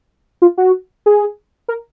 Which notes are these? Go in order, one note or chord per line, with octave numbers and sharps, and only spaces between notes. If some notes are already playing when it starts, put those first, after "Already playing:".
F4
F#4
G#4
A#4